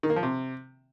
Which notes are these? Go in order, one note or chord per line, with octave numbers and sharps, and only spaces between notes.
D#3
A#3
F3
C3